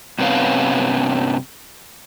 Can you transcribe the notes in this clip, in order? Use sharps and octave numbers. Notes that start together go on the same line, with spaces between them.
G2 C3 B3 C#4 F5